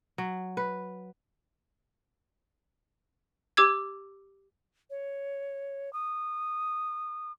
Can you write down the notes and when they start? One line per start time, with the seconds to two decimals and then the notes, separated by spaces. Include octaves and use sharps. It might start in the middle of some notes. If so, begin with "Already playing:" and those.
0.18 F#3
0.57 B4
3.57 G4 D6 E6 G#6
4.90 C#5
5.93 D#6